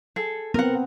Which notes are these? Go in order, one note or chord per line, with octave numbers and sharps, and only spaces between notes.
G#4 A4
B3 C4 A#4 F#5